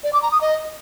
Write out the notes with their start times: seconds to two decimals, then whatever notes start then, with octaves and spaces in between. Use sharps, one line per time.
0.04 D5
0.13 D6
0.22 A#5
0.32 D#6
0.41 D#5